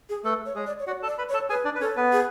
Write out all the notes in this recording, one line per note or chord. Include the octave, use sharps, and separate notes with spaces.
G#4
A3 A4 B4
C#5
G#3 G#4
D5
C#5
F#4 D5 F#5
A4 A5
D5
B4 B5
C#5
A4 A5
G#4 B4 G#5
D4 D5
B4
C#4 A4 C#5
B3 B4
G#4